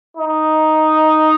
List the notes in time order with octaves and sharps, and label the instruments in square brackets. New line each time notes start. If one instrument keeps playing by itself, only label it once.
[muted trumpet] D#4